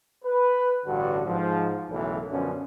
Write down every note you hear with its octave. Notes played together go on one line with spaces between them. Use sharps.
B4
A1 G2 D3 F#4
G#2 F3
B1 F#2 C#3 E3 A3
F#2 B2 D3 F3 C#4